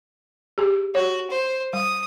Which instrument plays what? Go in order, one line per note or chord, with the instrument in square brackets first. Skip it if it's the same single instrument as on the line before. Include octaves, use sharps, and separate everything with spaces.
[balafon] G4 G#4
[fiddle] F#4 [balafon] C#5
[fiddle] C5
[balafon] G3 [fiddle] D#6